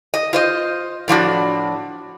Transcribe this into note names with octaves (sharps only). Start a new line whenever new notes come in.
D#5
F4 C5 D#5
A2 F3 D4 F#4